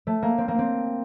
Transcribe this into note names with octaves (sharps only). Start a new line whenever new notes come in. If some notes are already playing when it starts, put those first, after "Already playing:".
A3
A#3
C4
A#3
C4